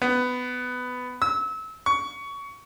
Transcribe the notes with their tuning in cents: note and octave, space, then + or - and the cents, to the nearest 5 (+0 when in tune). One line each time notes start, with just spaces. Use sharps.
B3 +15
E6 -30
C#6 +20